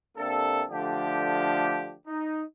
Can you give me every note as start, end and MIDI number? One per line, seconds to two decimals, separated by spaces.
0.17 0.63 48
0.17 0.63 58
0.17 0.63 62
0.17 0.63 69
0.70 1.95 50
0.70 1.95 53
0.70 1.95 57
0.70 1.95 62
0.70 1.95 67
2.08 2.43 63